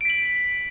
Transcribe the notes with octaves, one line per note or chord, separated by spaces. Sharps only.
B6 D7 F#7